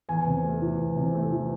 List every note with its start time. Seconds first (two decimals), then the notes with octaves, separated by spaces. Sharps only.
0.09 E2 G#5
0.27 C3
0.44 A3
0.62 E3
0.79 E2
0.96 C3
1.15 A3
1.32 E3